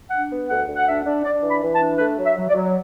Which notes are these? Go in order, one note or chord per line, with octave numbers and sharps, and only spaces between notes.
D4 F#5
B3
D2 F#5
D2
F#5
D4 E5
D4
D4 D5
E3
B5
E3
A5
D4
A3 B4
F#3
E5
F#3
D5
F#3